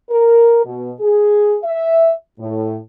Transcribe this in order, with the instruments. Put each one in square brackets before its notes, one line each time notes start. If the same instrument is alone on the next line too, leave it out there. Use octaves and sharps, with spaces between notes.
[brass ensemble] A#4
B2
G#4
E5
A2